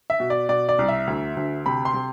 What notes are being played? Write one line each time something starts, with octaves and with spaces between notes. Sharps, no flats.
E5
B2
D5
B2 D5
D5
C2
E5
D2
D2
C3 B5
C6
C3